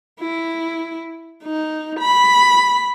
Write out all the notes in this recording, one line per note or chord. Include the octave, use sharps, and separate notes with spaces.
E4
D#4
B5